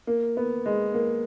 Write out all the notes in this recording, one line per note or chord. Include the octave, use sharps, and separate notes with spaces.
A#3
B3
G#3
A#3